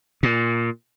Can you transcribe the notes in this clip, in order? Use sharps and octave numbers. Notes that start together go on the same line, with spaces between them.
A#2